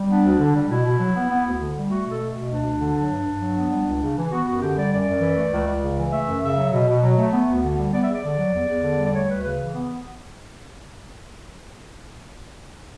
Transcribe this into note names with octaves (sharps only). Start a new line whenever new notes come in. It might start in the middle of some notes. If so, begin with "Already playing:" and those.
Already playing: G3
B3 D4
D2
D3
G3
B2 E4
B2
F#3
B3
B3
D2
D3
G3
A3 F#4
B2
A4
A3
B2
D2 D4
D2
D3
F#3
G2
G2
F#3
B3
G3
C#2
C#3
E3
B3 F#4
F#2 F#4
D3 G4
G3 D5
F#2 D5
F#2
E3
A3
C#2
C#2
C#3
E3
A3 E5
F#2
C#3 E5
F#3
B2
B2
F#3
A3
B3
D2
D3
G3
B3 D5
E5
E2 D5
D3
F#3
E2
E2
D3
G3
D5
A3 C#5
D2 B4
C#3 B4
E3
B3